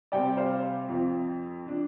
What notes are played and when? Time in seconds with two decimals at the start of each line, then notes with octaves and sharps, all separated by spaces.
0.12 C3 G3 C4 D5 G5
0.37 C5 F5
0.88 F2 F3 C4
1.66 F3 D4